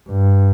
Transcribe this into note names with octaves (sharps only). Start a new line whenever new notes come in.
G2